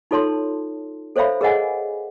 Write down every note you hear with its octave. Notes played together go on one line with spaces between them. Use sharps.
D#4 F4 A4 C#5 A5 C6
A4 C5 C#5 E5 F5 B5
G#4 A#4 D#5 F#5 G#5